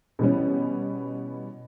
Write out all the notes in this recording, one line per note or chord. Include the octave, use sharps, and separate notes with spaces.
B2 E3 G3 C#4